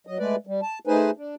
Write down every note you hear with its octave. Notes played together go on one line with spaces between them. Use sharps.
F#3 D#5
G#3 A3 B4 D5
G3
A5
A3 D#4 G#4 B4 C5 G#5
D4